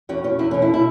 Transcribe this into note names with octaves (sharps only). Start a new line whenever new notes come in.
E2 C#4 F#4
E2 C#4
E2 E4
B2 C#4
E4
E4